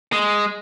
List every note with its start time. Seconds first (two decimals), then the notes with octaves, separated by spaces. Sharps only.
0.13 G#3